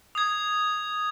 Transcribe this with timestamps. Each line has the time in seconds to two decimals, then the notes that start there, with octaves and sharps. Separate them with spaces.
0.15 D#6 G#6